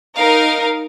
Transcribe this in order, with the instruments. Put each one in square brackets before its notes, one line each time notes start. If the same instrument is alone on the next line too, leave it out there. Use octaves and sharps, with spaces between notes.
[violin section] D#4 A#4 [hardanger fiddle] F5